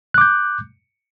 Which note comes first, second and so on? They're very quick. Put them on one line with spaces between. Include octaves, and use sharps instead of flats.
F#6 D6 G6